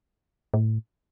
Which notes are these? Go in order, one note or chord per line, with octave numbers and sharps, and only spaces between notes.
A2